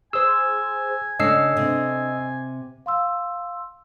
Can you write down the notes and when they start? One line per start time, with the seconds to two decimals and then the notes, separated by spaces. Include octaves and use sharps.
0.13 G#4 C5 G#5 E6
1.19 C#3 A3 D4 D#5 E6 C7
1.57 C3
2.86 F5 C6 E6